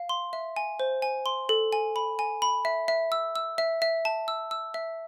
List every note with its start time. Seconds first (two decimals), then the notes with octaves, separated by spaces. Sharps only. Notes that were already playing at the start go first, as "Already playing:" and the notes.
Already playing: F5
0.09 C6
0.33 E5
0.56 G#5
0.80 C5
1.02 G#5
1.26 C6
1.49 A4
1.73 G#5
1.96 B5
2.19 G#5
2.42 B5
2.65 E5
2.88 E5
3.12 E6
3.35 E6
3.58 E5
3.82 E5
4.05 A5
4.28 E6
4.51 E6
4.74 E5